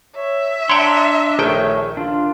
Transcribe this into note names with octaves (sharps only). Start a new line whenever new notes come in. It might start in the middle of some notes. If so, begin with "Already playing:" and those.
C#5 E5
D4 C#5 F#5 G5 A5 A#5 C6
A#1 D#3 A3 G#4 C#5 G5
D4 F4